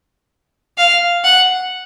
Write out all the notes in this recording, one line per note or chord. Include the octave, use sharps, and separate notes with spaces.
F5
F#5